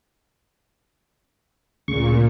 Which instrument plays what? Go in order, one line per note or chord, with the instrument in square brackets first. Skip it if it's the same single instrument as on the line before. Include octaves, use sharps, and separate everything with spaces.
[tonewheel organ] D2 C#3 C#6 [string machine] A#2